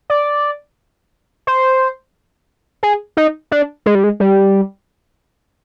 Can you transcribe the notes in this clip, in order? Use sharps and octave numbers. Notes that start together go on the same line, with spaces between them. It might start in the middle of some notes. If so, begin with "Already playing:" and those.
D5
C5
G#4
D#4
D4
G#3
G3
G#3
G3